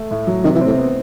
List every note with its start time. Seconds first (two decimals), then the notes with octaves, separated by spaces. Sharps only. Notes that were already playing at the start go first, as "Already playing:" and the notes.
Already playing: A3
0.11 A2
0.27 F#3
0.44 C3 D#3
0.55 E3
0.61 A2 C4
0.78 B3